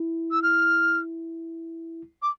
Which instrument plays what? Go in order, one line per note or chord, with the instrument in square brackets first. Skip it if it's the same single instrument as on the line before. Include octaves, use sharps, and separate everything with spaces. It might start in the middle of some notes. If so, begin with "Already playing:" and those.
Already playing: [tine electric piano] E4
[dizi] E6
F6
D6